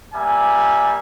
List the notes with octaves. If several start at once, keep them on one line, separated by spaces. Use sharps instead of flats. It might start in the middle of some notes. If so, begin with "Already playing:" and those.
G3 A#3 E5 G#5